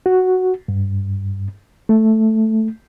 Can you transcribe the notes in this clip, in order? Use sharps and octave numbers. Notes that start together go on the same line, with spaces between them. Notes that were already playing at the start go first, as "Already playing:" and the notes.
F#4
G2
A3